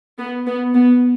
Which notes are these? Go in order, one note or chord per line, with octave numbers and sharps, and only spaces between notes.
B3
B3
B3